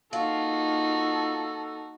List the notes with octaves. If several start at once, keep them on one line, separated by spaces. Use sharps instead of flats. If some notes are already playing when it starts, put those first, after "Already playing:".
A#3 D#4 F4 F#4 A4